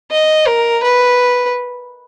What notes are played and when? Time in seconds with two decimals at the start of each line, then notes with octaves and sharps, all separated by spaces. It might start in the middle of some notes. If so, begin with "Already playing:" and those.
0.11 D#5
0.47 A#4
0.83 B4